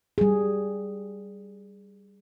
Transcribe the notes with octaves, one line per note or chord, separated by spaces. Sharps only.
G3 G#4